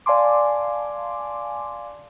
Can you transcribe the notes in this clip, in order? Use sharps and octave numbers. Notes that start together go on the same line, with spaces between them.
D5 F5 G#5 A5 C6 D6